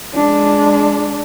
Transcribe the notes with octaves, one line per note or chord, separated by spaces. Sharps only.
G#3 D4